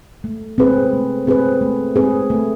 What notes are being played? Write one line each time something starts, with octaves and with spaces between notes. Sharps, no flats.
A3
C4 G#4 B4
A3
C4 G#4 B4
A3
C4 G#4 B4
A3